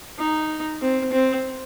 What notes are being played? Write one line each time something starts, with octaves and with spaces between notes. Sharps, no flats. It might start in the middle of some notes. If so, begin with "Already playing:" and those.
D#4
C4
C4